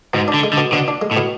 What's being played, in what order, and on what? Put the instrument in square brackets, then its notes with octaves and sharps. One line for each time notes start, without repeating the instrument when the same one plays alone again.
[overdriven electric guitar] G#2 [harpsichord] B2
[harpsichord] D4
[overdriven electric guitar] D3
[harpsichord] G#3
[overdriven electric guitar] D3
[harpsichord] B2
[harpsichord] B2 [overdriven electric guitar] D3
[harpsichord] D4
G#3
[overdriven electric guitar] A2
[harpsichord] B2